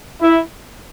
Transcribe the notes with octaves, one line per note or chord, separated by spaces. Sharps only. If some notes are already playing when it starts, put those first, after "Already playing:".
E4